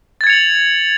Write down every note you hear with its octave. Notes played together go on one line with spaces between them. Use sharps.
G#6 A6 C#7 F7 F#7